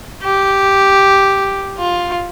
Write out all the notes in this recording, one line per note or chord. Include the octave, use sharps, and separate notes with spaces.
G4
F4